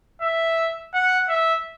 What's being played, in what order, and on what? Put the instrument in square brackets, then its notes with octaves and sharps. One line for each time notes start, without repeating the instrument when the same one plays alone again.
[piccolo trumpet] E5
F#5
E5